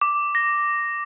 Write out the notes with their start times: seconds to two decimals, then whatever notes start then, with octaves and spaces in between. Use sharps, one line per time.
0.01 D6
0.35 A#6